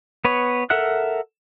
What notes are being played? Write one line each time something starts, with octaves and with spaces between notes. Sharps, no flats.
B3 B4 C#5
A4 A#4 E5 F#5 F#6